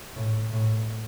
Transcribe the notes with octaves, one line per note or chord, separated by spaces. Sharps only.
A2
A2